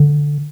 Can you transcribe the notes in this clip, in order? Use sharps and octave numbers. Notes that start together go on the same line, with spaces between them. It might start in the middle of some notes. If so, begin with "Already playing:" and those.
Already playing: D3